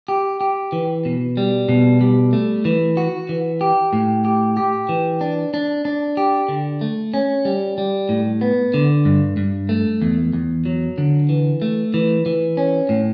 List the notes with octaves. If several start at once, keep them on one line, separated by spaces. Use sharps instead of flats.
G4
G4
E3
B2
G3
B2
G3
A3
E3
F#4
E3
G4
A2
G4
G4
E3
D4
D4
D4
G4
D3
A3
C#4
G3
G3
A2
B3
D3
G2
G2
A3
E2
E2
F#3
D3
E3
A3
E3
E3
C#4
A2